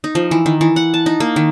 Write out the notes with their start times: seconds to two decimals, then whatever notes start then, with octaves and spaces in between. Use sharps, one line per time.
0.04 D#4
0.15 F3
0.31 E3
0.46 D#3
0.61 E3
0.76 F#5
0.94 A5
1.06 D#4
1.20 A#3
1.36 D#3